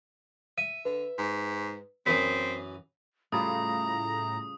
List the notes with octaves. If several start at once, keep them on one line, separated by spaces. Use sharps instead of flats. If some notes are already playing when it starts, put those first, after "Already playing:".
E5 D#7
D3 B4
G#2
F#2 E3 C4 D#6 B6
A2 C#3 G3 F4 A#5 D#6